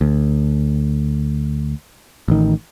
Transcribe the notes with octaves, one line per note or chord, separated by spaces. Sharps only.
D2
A1 D#3